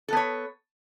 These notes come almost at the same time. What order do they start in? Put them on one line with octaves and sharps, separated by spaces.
A4 B3 C#5